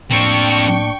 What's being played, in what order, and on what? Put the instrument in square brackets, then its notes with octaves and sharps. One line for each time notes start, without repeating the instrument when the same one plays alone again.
[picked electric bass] A2 A#3 [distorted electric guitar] F3 C4 [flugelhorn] D4 [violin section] G5 C#6